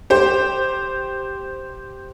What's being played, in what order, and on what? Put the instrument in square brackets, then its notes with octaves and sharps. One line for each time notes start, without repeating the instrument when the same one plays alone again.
[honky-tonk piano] G4 C5